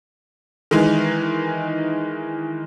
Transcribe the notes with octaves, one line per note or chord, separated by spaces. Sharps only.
D#3 E3 G#3